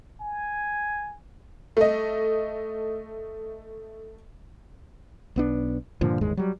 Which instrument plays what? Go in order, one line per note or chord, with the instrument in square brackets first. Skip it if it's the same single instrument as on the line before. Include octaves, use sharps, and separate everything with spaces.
[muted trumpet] G#5
[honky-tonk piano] A3 D#5
[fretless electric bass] B1 B3 D4
G2 A#2 D3 F3
G1 D#2 G#2 G#3
F#3 G3